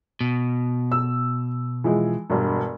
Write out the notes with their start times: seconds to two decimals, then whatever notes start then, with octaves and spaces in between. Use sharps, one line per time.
0.21 B2
0.92 E6
1.84 E3 F3 G#3
2.30 E1 G2